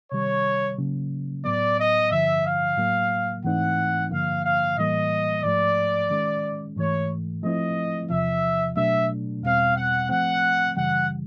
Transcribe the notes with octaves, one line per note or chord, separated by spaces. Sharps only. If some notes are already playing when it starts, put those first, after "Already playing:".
C3 D#3 G3 C#5
C#3 F#3 A#3 C#4
A2 F#3 B3 D5
D#5
G2 D3 F3 E5
F5
A2 F#3 A#3
G#2 E3 A3 C4 D#4 F#5
G2 D3 F3 A#3 F5
F5
A2 E3 G3 A#3 D#5
G#2 F3 A3 D5
D#3 G#3 C#4
G#2 E3 A3 C#5
F3 A3 C4 E4 D#5
E2 C3 F3 E5
B2 F#3 A3 D4 E5
E2 B2 G3 C4 F5
F#5
F3 A3 C4 F#5
F#2 C#3 E3 G3 F#5